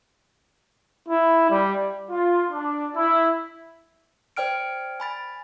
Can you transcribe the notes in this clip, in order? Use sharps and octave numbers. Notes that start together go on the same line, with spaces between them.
E4
G3
F4
D4
E4
C5 D5 G5 F6 D7
G#5 B5 A6